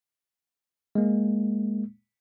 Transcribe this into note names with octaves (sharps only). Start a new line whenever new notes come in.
G#3 A#3